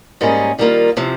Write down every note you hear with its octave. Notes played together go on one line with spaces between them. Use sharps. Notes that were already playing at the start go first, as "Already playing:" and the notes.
G#2 G3 A#3 C#4 G#4
D#3 G3 A#3 F4
C3 F3 C4